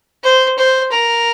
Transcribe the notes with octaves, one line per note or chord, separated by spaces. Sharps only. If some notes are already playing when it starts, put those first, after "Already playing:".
C5
C5
A#4